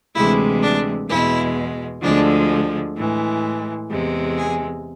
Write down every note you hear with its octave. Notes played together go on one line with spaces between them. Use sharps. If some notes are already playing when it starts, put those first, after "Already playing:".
D2 C3 E3 G#3 E4
D4
E2 B2 G#3 E4
D2 D3 F3 G#3 D4
A2 E3 G#3
E2 C3 G#3
G#4